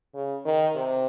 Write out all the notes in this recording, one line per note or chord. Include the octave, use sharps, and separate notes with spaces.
C#3
D#3
C3